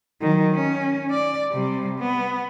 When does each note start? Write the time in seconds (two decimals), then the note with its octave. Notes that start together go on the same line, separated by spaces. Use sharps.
0.22 D#3 F#3
0.54 C#4
1.11 D5
1.52 C3 G3
2.00 B3